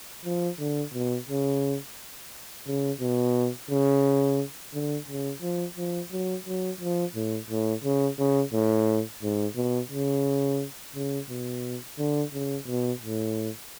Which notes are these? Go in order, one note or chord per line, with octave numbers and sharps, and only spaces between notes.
F3
D3
B2
C#3
C#3
B2
C#3
D3
C#3
F3
F3
F#3
F#3
F3
A2
A2
C#3
C#3
A2
G#2
B2
C#3
C#3
B2
D3
C#3
B2
A2